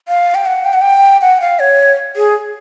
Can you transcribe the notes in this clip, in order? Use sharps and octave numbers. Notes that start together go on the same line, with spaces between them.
F5
G5
F#5
G5
F#5
G5
F#5
F5
C#5
G#4